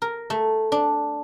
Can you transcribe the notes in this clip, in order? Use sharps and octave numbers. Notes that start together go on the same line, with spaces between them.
A#4
A3
D4